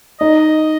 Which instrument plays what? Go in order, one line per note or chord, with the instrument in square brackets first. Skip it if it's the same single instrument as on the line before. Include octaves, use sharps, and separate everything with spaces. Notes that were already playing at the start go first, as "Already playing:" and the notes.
[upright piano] D#4 [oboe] D#5